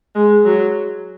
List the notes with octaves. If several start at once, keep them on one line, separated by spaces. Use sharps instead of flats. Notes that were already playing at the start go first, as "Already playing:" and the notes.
G#3
F#3